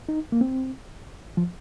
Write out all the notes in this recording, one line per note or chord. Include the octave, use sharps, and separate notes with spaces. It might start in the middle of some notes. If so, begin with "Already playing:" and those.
D#4
A#3
C4
F3